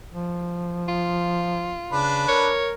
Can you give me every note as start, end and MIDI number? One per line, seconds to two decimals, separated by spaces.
0.12 1.76 53
0.88 1.97 65
1.92 2.26 49
1.92 2.49 62
1.92 2.49 71
2.28 2.74 70
2.28 2.70 73